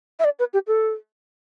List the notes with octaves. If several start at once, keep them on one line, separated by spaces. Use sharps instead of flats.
E5
D5
B4
G4
A4